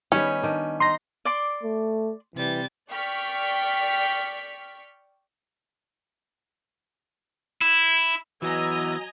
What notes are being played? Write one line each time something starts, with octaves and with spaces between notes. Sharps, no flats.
D#3 G3 B3 C#4
D#3 D4
D#4 C6 A#6
D5 C6 D6
A3
C3 E3 G3 A6
D5 G5 C#6 F6 B6
E4
E3 F#3 B3 D#5 G#5 A#5 E6